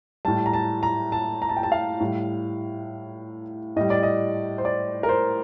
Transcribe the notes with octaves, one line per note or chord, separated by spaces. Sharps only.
A2 G3 A5
A#5
A5
A#5
A5
A#5
A5
G5
A5
F5
A2 G3
A2 G3 D#5
D5
D#5
C5
D5
A#4
C5